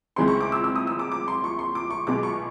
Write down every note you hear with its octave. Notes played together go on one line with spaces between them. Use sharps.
C#2 C#3 E3 G#3 C4 C6
C#6
D6
E6
E6
D#6
E6
D6
D6
C6
C#6
C6
D6
C#6
B1 B2 G#3 B3 D6
C#6